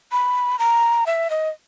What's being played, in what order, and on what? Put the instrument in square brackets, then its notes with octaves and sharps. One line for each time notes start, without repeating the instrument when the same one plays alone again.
[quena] B5
A#5
E5
D#5